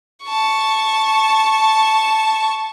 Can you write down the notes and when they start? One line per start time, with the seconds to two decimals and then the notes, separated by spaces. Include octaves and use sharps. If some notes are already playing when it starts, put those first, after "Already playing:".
0.25 A5 C#6